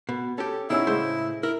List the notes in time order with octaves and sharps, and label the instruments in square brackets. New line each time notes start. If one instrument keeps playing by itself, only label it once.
[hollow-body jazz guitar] B2
[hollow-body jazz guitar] C#4 G4 [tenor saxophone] A4
[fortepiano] B2 C#4 E6 [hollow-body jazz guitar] D#4 G#4 G5 [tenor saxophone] E4
[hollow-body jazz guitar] A2 C#3 C5 [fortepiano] G#3
[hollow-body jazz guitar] E4 [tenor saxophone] A#4